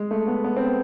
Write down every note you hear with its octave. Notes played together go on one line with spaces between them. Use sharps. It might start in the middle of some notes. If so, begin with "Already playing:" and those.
Already playing: G#3
A3
B3
B3
C4